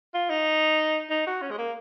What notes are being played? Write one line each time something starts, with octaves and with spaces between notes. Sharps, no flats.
F4
D#4
D#4
F#4
C#4
G#3
A#3